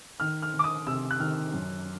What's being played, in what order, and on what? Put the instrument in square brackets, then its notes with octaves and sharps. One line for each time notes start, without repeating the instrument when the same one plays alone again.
[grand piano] D#3 [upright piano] F6
[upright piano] F6
[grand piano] D#3
[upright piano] D6
D#6
[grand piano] C3 [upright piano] E6
[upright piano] F#6
[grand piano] D#3 [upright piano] F6
[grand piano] F#2